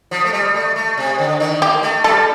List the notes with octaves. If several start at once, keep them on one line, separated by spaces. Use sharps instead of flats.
F3
A3
G3
A3
A3
C3
D3
D#3
A#3 G4
A3
G3 A4